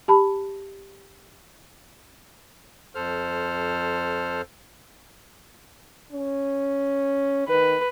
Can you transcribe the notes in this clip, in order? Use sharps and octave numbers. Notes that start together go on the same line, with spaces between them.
G4 A5 B5
F2 A4 C5 F6
C#4
D#3 B4